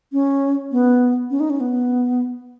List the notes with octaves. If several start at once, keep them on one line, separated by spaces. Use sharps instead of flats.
C#4
B3
C#4
D#4
C#4
B3